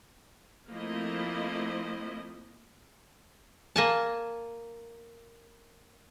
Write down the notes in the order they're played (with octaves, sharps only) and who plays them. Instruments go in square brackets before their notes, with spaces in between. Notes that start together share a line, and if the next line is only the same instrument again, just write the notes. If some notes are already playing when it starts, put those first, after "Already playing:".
[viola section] F3 A3 A#3 C4 E4 D#5
[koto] A#3 G#5 A5